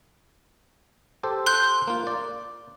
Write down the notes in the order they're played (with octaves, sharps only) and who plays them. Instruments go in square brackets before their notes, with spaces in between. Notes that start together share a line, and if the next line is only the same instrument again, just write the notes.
[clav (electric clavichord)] G4 A4 C5
[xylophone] C6 F#6 G6
[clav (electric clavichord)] A#3 F4
D5